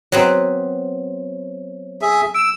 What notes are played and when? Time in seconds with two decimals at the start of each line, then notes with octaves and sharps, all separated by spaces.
0.12 F#3 B3 C4 C5 C#5
2.02 G#4 E5
2.35 E6 D7 E7